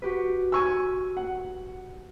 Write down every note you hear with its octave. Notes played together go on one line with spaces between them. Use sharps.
F#4 G4 B4
G#5 C#6 E6
F#5